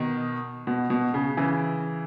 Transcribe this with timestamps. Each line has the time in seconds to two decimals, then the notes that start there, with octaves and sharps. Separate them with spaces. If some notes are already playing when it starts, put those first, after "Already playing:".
Already playing: B2 D#3
0.67 B2
0.90 B2
1.14 C#3
1.37 C#3 E3